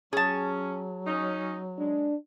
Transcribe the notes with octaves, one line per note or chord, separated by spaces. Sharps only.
F#3 C#4 G#4 A5
C#4 D#4
G#3 D4